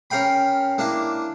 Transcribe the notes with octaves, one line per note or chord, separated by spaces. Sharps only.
C#4 A#4 F5 G5 B5
A#3 D4 E4